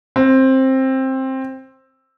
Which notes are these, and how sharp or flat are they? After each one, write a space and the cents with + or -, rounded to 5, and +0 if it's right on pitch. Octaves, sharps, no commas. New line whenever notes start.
C4 +15